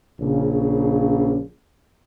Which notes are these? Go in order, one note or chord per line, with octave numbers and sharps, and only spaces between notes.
A#1 C#3